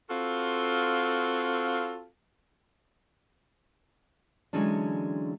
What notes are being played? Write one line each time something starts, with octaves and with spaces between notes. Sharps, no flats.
C4 F4 F#4 A4 F5
D3 E3 F#3 G#3 C#4 D4